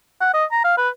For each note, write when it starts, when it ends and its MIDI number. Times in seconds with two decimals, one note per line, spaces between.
0.21 0.34 78
0.34 0.45 75
0.52 0.61 82
0.64 0.75 77
0.78 0.89 71